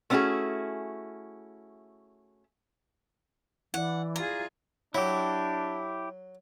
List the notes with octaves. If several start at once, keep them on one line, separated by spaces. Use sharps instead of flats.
A3 B3 C#4 E4 F#4 G#4
E3 E4 D5 F#5
F4 G#4 A#5
F#3 D4 E4 G4